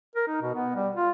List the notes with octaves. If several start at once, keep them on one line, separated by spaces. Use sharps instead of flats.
A#4
D#4
B2
B3
G3
F4